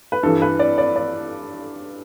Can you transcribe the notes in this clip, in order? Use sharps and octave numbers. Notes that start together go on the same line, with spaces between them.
B4
G2 E3 A4
B4
D5
D5
D5